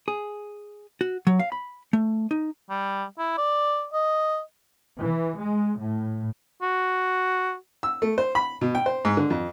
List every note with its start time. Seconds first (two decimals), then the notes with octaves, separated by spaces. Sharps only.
0.08 G#4
1.01 F#4
1.27 F#3
1.40 F5
1.52 B5
1.93 A3
2.31 D#4
2.70 G3
3.18 E4
3.38 D5
3.93 D#5
5.00 E3
5.38 G#3
5.82 A2
6.62 F#4
7.83 E6
8.02 A3
8.18 C5
8.35 B5
8.61 B2
8.75 G5
8.86 C5
9.05 G#2
9.17 D3
9.30 F2